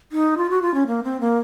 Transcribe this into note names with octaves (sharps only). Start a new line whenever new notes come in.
D#4
F4
F#4
F4
C#4
A#3
C4
A#3